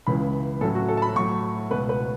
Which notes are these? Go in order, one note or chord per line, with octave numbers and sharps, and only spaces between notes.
C#2 C#3 E3 C#4 B5
A2 F#3 C#4 A4
F#4
A4
A5
B5
A2 F#3 A3 C#6
C#2 B2 B3 B4
B4